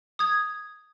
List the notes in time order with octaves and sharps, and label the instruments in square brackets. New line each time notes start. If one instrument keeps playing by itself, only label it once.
[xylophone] D#6 G#6